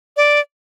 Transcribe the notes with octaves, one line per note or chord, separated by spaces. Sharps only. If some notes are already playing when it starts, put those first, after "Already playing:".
D5